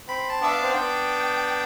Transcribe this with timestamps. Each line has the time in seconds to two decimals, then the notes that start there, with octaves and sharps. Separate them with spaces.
0.08 C4 B5
0.30 A5
0.41 B3 D4 E5
0.52 F5
0.62 C4
0.73 B3 D4 G5